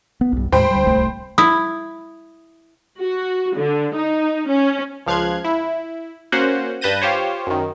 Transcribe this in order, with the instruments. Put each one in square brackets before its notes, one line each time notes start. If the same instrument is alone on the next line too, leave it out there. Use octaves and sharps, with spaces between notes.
[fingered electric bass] B3
B1 G2
[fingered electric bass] D#2 A2 G#3 [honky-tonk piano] C5 G5 B5
[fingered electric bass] D2 G3
D1 C2 A3
[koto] E4 [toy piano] D#6
[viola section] F#4
D3
D#4
C#4
[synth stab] C#2 F3 F5 F#6 G#6
E4
A#3 C#4 F#4 C5 F#5
G2 B4 A5 G6 A#6 D#7
F4 G4 C5 C#5
F#2 D#3